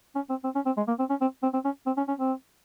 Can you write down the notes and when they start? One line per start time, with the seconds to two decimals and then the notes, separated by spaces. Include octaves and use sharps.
0.15 C#4
0.30 C4
0.44 C4
0.55 C#4
0.66 C4
0.77 G#3
0.88 A#3
0.99 C4
1.10 C#4
1.21 C4
1.43 C4
1.54 C4
1.65 C#4
1.87 C4
1.97 C#4
2.08 C#4
2.19 C4